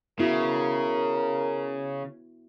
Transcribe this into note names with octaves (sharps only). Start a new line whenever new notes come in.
C#3 B3 E4 F#4 A#4